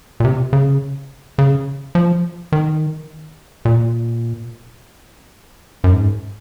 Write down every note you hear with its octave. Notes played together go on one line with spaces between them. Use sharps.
A#2
C3
C#3
C#3
F3
D#3
A#2
F#2
G#2